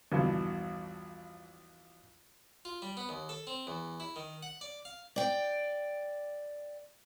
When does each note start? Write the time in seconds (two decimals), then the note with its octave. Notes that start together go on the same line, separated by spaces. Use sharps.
0.12 A#1 E2 G2 B2
2.65 F4
2.82 G3
2.97 B3
3.09 D#2
3.29 A4
3.47 C4
3.67 E2
4.00 E4
4.16 D#3
4.43 F#5
4.61 D5
4.85 F5
5.16 D5 G5